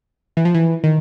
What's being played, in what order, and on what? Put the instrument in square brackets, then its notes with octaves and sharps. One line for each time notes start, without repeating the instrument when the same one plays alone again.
[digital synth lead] E3
F3
E3
D#3